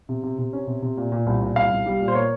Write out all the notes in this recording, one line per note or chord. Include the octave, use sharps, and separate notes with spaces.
C3
C3
C3
C#4
C3
C3
A#2
A#2
C2
A#2
C2 F5
C2
G3
A#2
C5
A#3 C#5